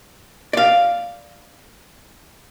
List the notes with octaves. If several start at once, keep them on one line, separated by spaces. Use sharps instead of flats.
D5 F5